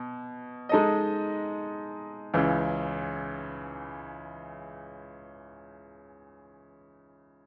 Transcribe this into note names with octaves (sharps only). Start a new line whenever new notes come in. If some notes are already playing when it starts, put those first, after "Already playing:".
Already playing: B2
G#3 D#4 A4 D#5
C#2 C#3 E3